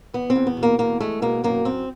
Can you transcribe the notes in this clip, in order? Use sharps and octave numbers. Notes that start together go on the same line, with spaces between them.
E2 B3
C4
E2
B3
B2
A#3
E2 A#3
G#3 A3
B2 A#3
F#2 A#3
F#2 C4